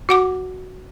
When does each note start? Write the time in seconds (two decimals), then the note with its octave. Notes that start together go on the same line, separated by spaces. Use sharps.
0.09 F#4 F#5 D6